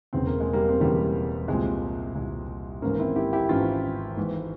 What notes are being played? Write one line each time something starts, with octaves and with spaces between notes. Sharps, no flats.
E1 E2 C#3 E3 C4
A#3
G#3
G3 A#3
C4
E1 E2 C#3 E3 G3 A#3
C2 A#2 G#3 C4
C2 A#2
G#1 G#2 E3 A#3 C#4
C4 E4
E4 G4
E4 G4
G#1 G#2 E3 C#4 F4
G#1 G#2 E3